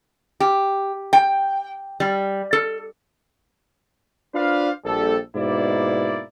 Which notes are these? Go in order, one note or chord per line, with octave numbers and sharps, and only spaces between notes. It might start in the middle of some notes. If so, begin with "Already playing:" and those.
G4
G5
G3
A4
D4 F4 B4 C5 D5 F5
A#1 G3 A4
G#2 B2 A#3 E4 D5